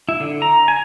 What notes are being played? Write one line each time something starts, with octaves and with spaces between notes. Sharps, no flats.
E4
D3
A#5
G#5